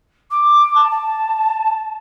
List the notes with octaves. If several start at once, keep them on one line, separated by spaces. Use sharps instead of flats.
D6
A5
A5